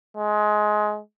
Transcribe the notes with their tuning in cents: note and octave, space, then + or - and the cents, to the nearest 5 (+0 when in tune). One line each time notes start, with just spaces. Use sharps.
G#3 +20